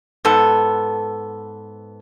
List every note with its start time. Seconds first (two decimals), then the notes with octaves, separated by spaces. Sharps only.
0.25 G#2 B3 A4